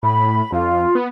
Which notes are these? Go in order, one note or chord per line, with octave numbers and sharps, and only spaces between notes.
A2 B5
F2 F4
B3